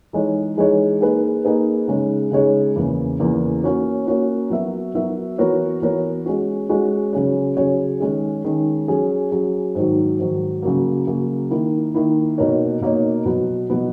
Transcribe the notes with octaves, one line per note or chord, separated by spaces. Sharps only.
E3 G#3 D#4 G#4 C#5
E3 G#3 D#4 G#4 C#5
A#3 D#4 G#4 B4
A#3 D#4 G#4 B4
C#3 G#3 D#4 G#4 C#5
C#3 G#3 D#4 G#4 C#5
E2 C#3 E3 A#3
E2 C#3 E3 A#3
A#3 C#4 F#4 C#5
A#3 C#4 F#4 C#5
F#3 B3 F#4 A#4 E5
F#3 B3 F#4 A#4 E5
E3 B3 F#4 A#4 C#5
E3 B3 F#4 A#4 C#5
G#3 C#4 F#4
G#3 C#4 F#4
C#3 F#3 C#4 G#4 C#5
C#3 F#3 C#4 G#4 C#5
D#3 G#3 C#4 G#4
D#3 G#3 C#4 G#4
F#3 C#4 G#4
F#3 C#4 G#4
G#2 D#3 F#3
G#2 D#3 F#3
C#3 F#3 A#3
C#3 F#3 A#3
D#3 A#3 E4
D#3 A#3 E4
B2 A#3 D#4 A#4 C#5
B2 A#3 D#4 A#4 C#5
B2 F#3 B3
B2 F#3 B3